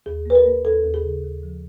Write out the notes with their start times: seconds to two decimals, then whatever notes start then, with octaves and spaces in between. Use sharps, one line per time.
0.06 D#2 G#4
0.26 A#3 B4
0.35 A#4
0.46 A#3
0.65 D#2 A4
0.84 D#2
0.94 G#4
1.03 C#3
1.23 D#2
1.43 F3